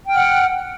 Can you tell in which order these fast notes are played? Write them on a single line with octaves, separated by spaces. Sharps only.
G5 F6 F#5